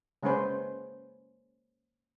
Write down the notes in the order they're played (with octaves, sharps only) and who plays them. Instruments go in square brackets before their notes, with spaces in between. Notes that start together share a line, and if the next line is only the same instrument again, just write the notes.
[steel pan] C#3 G#3 A#3 C#4 B4 C5